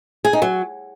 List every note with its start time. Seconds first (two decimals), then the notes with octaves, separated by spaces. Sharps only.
0.25 G#4
0.33 D#4
0.42 F#3